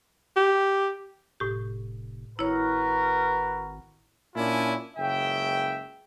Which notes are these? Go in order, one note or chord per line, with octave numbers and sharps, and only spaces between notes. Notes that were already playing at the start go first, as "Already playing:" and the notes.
G4
F1 A2 G4
G#1 E4 F#4 A#4 B4 C#5
A#2 C#4 D4 E4 F4 G#5
F#1 C#2 C#3 E5 G5